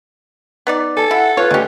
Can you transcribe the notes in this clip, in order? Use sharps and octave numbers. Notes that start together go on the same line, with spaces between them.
B3 D#4 D5
A4 G#5 A5
E4 F#5
F4 B4 C#5
D2 G#3 C#4 G4